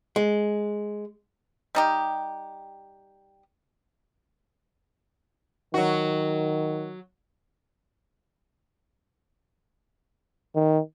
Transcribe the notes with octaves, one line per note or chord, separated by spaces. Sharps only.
G#3
G3 D#4 G4
D#3 F#3 F#4
D#3